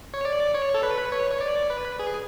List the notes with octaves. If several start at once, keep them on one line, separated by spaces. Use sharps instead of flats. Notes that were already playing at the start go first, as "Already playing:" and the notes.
C#5
D5
C#5
A4
B4
C#5
C#5
D5
B4
G#4